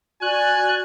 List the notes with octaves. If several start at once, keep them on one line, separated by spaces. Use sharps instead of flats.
F#4 D5 G#5 F#6